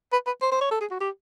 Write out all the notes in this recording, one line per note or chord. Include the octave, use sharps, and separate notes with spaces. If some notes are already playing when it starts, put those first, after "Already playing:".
B4
B4
C5
C5
C#5
A4
G#4
F#4
G4